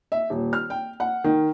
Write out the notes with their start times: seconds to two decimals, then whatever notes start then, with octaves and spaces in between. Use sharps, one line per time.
0.12 E5
0.30 D#1
0.53 F6
0.70 G5
1.00 F#5
1.24 D#3